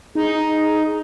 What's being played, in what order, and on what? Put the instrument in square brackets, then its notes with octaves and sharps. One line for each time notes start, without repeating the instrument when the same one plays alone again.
[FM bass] D#4 [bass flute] G#4